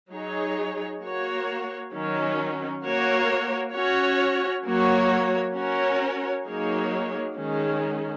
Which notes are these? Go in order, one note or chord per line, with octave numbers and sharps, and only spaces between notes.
F#3 D#4 G#4 C#5
A#3 F#4 C#5
D#3 F#3 C#4
A#3 F#4 A#4 C#5
C#4 F#4 C#5
F#3 A#3 F#4 C#5
C#4 F#4 A#4 C#5
F#3 A#3 D#4 G#4 C#5
D#3 G#3 C#4 G#4